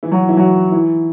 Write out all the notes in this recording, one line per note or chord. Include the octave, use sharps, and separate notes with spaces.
E3 E4
F#3 F#4
E3 E4
F#3 F#4
E3 E4